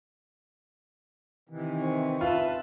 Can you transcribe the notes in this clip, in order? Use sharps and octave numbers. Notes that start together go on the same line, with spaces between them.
C3 D#3 E3
C4 C#6
F4 B4 E5 A5